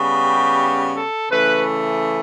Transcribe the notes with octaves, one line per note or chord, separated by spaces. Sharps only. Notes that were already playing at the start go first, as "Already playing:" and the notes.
Already playing: C#3 G3 B3
G4
A4
C#3 E3 A3 B4